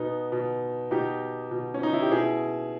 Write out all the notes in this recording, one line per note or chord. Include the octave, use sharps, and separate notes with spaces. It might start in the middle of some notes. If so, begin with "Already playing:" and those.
Already playing: B2 B3 D#4
B2
B2 D#4 G4
B2
C#4
D#4
E4
G4
B2 E4 G#4